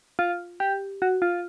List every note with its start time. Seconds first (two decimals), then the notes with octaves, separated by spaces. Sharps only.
0.19 F4
0.60 G4
1.02 F#4
1.22 F4